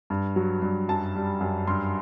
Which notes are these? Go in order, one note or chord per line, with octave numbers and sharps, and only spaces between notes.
G2
F#3
G2
F#2 A5
G3
F#2
G2 C6